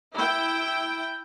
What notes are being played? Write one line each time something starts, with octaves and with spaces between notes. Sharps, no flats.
E4 G5